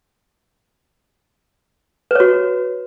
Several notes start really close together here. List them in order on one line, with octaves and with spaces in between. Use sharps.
B4 C#5 F#4